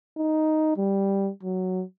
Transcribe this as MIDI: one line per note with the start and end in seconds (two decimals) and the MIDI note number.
0.17 0.73 63
0.77 1.30 55
1.43 1.83 54